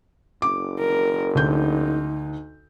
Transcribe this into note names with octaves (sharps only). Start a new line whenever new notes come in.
F#1 D6
A#4
D2 D#4 G6